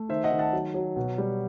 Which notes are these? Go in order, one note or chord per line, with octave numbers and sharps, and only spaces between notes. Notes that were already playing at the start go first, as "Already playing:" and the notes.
Already playing: A3
D#3 C5 E5
D#5 F#5
D#3
F#5 A5
F#3
F#3
B2
G3